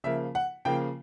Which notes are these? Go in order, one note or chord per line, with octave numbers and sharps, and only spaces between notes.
C#3 F3 A#3 E5
F#5
C#3 F3 A#3 G5